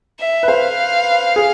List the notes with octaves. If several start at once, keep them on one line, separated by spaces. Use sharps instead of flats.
E5
B4
C5 F5
G#4